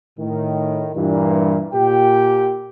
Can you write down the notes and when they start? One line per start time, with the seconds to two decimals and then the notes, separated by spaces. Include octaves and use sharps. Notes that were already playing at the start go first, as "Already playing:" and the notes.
0.19 A2 D#3
0.95 G2 A#2 E3
1.74 A#2 G4 G5